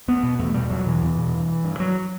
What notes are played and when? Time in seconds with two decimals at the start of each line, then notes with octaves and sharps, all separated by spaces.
0.08 E2 B3
0.23 B2
0.39 E2 A3
0.54 B2 G3
0.70 E2 F#3
0.86 B2 E3
1.02 E2
1.17 B2
1.34 G2
1.64 G2
1.80 F#3